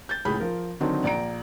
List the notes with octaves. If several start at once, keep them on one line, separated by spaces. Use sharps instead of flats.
G6 A6
C#2 A2 G#4 B5 G6
F3 A#4
D3 D#3 F#3 C4 D4 D#4
A#1 D5 A#5 D7